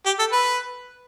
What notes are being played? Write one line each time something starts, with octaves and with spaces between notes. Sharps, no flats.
G4
A4
B4